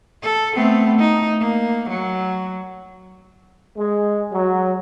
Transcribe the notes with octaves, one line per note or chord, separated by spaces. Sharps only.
A4
A3 B3 C4
D#4
A#3
F#3
G#3
F#3